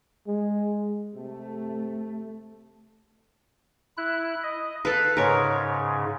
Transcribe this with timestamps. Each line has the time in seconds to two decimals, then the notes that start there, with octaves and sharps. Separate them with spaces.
0.27 G#3
1.15 C3 A3
3.97 E4 F#6
4.43 D#5
4.85 A4 B4 F5
5.17 G#2 C#3 A#4 C#5